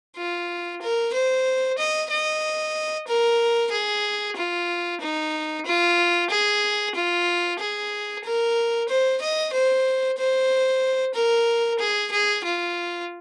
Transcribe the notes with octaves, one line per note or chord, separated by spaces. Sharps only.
F4
A#4
C5
D#5
D#5
A#4
G#4
F4
D#4
F4
G#4
F4
G#4
A#4
C5
D#5
C5
C5
A#4
G#4
G#4
F4